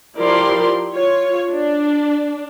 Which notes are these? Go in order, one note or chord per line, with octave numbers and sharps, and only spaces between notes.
F3 E4 G4 A#4 D5 C6
F4 C#5
D4